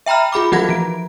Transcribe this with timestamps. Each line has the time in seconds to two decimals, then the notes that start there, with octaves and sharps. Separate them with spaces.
0.06 E5 G5 A#5 B5 F6
0.32 F4 G#4 B5 D6
0.52 E3 F#3 F#4 F#5 G#6 A#6
0.69 F3 D7